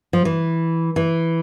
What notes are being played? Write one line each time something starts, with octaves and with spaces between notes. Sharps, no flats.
F3
E3
E3